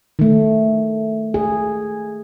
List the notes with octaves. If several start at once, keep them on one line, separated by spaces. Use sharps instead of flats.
D#3 A3
G#4